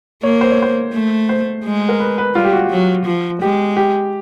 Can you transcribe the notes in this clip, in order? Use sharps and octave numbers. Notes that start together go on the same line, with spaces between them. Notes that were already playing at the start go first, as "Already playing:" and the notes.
A#3 C#5
C5
C#5
C5
A3
C5
G#3
A#4
B4
B4
G3 F4
G4
F#4
F#3
F3
G#3 G4
G4